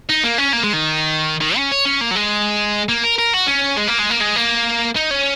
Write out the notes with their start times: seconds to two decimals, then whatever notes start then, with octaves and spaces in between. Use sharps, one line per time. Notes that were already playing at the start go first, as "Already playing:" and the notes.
0.09 D#4
0.24 A#3
0.38 C#4
0.53 A#3
0.64 G#3
0.73 D#3
1.41 D#3
1.56 C#4
1.71 C#5
1.85 C#4
2.01 A#3
2.11 F#3
2.15 G#3
2.89 A#3
3.04 A#4
3.19 A#4
3.34 F#4
3.48 C#4
3.77 G#3
3.88 A#3
4.00 G#3
4.11 A#3
4.21 G#3
4.36 A#3
4.96 D#4
5.11 C#4